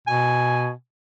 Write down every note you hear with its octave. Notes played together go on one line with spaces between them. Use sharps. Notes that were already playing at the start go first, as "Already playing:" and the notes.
B2 G#5